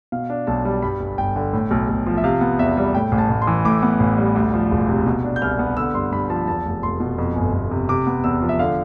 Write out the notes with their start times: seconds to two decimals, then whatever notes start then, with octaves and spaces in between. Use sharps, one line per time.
0.12 B2 F5
0.30 D4
0.47 B1 A5
0.65 G3
0.82 G2 B5
1.00 G1
1.18 G1 G5
1.36 D3
1.53 A2
1.71 B1
1.89 B1
2.07 F3
2.17 E5
2.24 C3 F5
2.41 B3
2.59 E2 E5
2.77 G3
2.94 A2 G5
3.12 A1
3.18 A5
3.30 A1
3.42 C6
3.47 E3
3.65 A2 D6
3.83 B3
4.00 A1
4.18 G3
4.36 D2
4.54 F3
4.71 E1
4.89 C3
5.06 B2
5.24 D4
5.36 G6
5.42 C2 F6
5.59 B3
5.77 D3 E6
5.94 G2 C6
6.12 G2 B5
6.30 F3 A5
6.47 E2 A5
6.65 F1
6.83 F1 C6
7.00 B2
7.18 F2
7.36 G1
7.53 G1
7.71 C3
7.89 C3 D6
8.07 B3
8.24 E2 E6
8.42 F3
8.49 E5
8.59 D3 F5